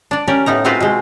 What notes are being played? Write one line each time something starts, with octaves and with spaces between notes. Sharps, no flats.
D4 D5
C#4 G4 A#4 D5
A2 B3 D#4 A#5
G#3 C4 F4 F#4 B4 F5
B2 G#3 C4